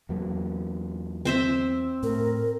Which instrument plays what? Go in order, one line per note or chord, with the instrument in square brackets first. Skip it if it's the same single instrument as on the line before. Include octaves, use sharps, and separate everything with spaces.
[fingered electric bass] E2 F#3 A#3
[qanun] C4 C5 E5
[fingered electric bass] A2 [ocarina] A#4